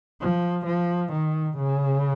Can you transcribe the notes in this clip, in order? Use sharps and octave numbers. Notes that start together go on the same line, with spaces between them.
F3
F3
D#3
C#3